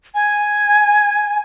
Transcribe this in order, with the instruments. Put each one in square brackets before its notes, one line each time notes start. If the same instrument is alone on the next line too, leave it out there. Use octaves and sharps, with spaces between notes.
[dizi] G#5